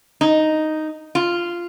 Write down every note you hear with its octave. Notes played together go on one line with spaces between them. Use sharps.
D#4
F4